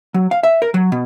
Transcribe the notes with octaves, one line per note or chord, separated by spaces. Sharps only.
F#3
F5
E5
A#4
F#3
B2